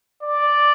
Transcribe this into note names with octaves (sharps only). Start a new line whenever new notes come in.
D5